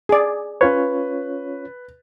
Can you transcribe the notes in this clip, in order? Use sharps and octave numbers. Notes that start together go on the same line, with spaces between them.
G#4 D5
C#4 F4 B4 C#5